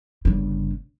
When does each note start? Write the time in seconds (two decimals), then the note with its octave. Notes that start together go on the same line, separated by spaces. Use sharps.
0.25 G1 C#3